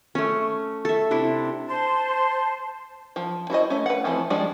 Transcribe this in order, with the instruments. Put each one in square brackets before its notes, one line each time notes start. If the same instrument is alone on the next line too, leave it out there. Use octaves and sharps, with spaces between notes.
[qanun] A3 C#4
A4 E5
C3 D4 E4
[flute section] C5 A5 C6
[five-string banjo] F3
E4 F#4 C5 D#5
A3 C#4
B4 F#5
E3 F3 A3 C4
F3 G3 G#3 D4